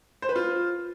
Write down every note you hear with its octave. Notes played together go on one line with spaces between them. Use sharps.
C5
B4
F4